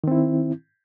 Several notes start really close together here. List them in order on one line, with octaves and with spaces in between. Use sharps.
D#3 C4 E4